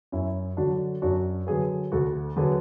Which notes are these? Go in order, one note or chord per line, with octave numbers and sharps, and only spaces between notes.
F#2 C#4 E4
D3 F#3 D4 F#4
F#2 D4 F#4
D3 F#3 G#4 B4
D2 F#4 A4
D3 F#3 G#4 B4